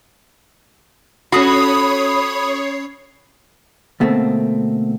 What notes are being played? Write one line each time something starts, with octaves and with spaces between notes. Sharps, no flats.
C#4 F#4 A4 C#5 B5 D#6 C7
D2 B2 A3 A#3 C4